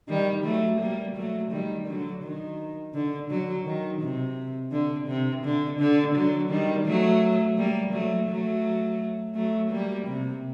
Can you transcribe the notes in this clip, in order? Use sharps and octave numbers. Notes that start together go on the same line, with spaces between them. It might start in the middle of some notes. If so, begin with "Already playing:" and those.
D#3 G3
F#3 A3
G3 A#3
F#3 A3
D#3 G3
D3 F#3
D#3
D3
D3 F#3
D#3
C3
D3
C3
D3
D3
D3 F#3
D#3 G3
F#3 A3
G3 A#3
F#3 A3
F#3 A3
F#3 A3
G3 A#3
C3